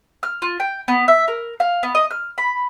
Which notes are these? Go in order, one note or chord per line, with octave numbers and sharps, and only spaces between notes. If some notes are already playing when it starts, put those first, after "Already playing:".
F6
F4
G5
B3
E5
A#4
F5
B3
D#5
F6
B5